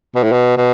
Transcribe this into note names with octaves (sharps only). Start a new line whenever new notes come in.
B2
A2
B2
B2